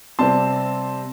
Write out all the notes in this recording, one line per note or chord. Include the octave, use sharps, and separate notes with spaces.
C3 G3 C4 A5 C6